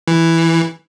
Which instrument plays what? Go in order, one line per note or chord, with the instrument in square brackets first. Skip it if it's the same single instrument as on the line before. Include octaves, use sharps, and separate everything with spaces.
[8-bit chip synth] E3